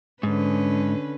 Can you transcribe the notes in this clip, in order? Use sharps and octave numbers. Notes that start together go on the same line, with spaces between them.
G#2 D3 C#4 B4